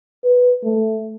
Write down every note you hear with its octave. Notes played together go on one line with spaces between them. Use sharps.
B4
A3